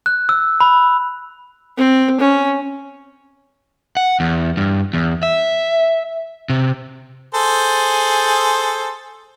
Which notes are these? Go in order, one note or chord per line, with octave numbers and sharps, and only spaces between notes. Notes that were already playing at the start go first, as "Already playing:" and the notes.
F#6
E6
B5
C4
C#4
F#5
E2
G2
E2
E5
C3
G#4 A4 C5